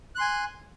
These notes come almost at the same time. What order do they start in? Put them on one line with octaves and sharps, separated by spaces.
F#6 C6 G#5